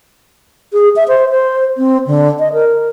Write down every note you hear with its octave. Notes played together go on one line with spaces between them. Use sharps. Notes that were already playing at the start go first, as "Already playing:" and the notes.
G#4
E5
C5
C5
C4
D3
D#5
A#4